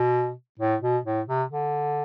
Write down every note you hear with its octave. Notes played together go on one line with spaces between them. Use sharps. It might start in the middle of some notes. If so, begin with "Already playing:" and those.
Already playing: B2
A2
B2
A2
C3
D3